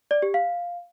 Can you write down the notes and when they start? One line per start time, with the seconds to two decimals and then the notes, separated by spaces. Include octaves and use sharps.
0.11 D5
0.22 G4
0.34 F5